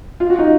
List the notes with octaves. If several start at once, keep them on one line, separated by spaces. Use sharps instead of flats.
F4
F#4
D#4 F4